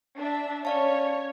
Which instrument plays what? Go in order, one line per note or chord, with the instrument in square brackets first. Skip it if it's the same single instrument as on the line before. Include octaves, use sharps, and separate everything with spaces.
[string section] D4 E5
[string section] C#4 [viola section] C#5 [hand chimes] D5 F5 A5